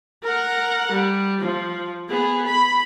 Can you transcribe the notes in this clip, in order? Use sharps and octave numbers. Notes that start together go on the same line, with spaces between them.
A#4 F#5
G3
F3
B3 G#4
B5